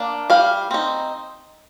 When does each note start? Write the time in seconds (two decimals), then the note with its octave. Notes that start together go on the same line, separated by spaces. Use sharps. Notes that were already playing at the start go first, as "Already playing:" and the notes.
Already playing: A#3 D4
0.30 G3 F5
0.71 C4 D#4